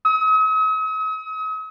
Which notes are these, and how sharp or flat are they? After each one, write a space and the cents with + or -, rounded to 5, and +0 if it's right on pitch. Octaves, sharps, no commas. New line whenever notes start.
D#6 +45